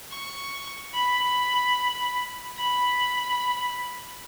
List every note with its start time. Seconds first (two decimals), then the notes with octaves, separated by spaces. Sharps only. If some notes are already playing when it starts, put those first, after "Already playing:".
0.11 C#6
0.93 B5
2.57 B5